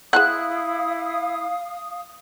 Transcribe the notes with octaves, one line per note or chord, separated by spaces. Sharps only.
E4 G#4 C5 F5 F#5 D#6 F#6